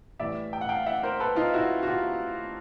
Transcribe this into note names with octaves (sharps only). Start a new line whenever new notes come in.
A2 E3 G3 D5 E5
G5
F#5
F5 G5
E5 F#5
A#4 C5
A4 B4
D#4 F4
E4 F#4
F#4
F4 G4